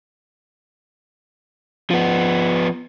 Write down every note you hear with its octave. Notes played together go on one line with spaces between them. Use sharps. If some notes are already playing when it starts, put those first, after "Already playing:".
F3 B3